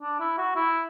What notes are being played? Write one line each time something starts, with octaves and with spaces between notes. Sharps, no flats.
D4
E4
F#4
E4